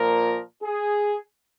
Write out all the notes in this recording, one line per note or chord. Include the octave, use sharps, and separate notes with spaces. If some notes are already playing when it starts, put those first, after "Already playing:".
Already playing: A#2 F3 A#4
G#4